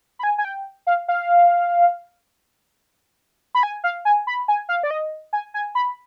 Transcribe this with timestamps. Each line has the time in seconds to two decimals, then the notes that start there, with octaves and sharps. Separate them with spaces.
0.19 B5
0.23 G#5
0.38 G#5
0.45 G5
0.87 F5
1.08 F5
3.55 B5
3.63 G#5
3.84 F5
4.05 G#5
4.27 B5
4.48 G#5
4.69 F5
4.83 D5
4.91 D#5
5.33 G#5
5.54 G#5
5.75 B5